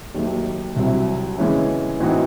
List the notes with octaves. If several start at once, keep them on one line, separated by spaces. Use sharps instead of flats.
D#2 D#3 F#3 A3
C2 C3 F#3 C4 E4
C#3 E3 G#3 C#4 E4
A2 E3 C4 D#4 F#4